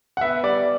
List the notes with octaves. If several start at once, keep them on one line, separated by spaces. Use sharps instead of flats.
F#5
B3 E5
G3 D5